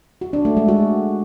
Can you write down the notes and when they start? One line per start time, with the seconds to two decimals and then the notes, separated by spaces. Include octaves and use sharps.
0.21 F#4
0.33 D4
0.45 A3
0.57 G#3
0.68 F#4